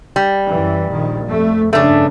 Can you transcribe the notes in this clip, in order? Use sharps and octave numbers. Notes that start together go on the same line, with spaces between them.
G3
F#2 E3
A#1 D#3
F2 A3
G2 C#3 A3 D4